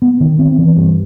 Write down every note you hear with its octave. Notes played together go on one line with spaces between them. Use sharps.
B3
D#3
C4
E3
G2